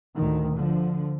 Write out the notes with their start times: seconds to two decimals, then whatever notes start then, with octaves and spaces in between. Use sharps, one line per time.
0.15 D2 A2 D#3
0.54 D3 F3